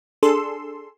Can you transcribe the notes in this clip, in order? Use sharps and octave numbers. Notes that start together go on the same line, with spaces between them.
D4 G#4 A4 C6 E6